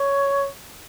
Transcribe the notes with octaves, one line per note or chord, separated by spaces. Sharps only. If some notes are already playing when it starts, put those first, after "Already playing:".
Already playing: C#5